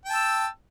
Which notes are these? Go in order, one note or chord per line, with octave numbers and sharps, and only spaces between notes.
G5 A5 E6